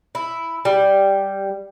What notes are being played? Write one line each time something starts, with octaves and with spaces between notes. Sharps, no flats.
E4
G3